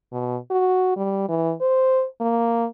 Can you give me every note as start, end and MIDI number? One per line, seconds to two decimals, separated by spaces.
0.13 0.37 47
0.51 0.93 66
0.97 1.27 55
1.29 1.53 52
1.61 2.05 72
2.21 2.66 58